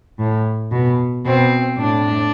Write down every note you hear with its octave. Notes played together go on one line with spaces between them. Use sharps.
A2
B2
B2 C4
A2 D4